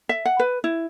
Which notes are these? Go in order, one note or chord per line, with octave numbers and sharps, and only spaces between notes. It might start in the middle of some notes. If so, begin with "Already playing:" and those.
E5
F#5
B4
E4